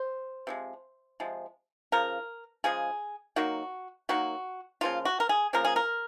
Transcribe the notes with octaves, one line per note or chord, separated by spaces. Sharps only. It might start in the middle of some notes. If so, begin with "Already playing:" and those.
Already playing: C5
C3 F3 G#3
C3 F3 G#3
C#3 F3 A#4
C#3 F3 G#3 G#4
D#3 F#3 A#3 F#4
D#3 F#3 A#3 F#4
C#3 F3 A#3 F4
F#4
A#4
G#4
C#3 F3 A#3 A#4
G#4
A#4